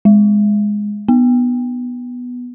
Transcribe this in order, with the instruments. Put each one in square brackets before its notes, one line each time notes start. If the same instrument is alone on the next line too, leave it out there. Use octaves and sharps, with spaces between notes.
[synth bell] G#3
B3